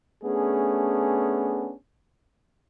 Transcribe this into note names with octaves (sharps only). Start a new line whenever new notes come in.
A3 B3 C#4 D4 G#4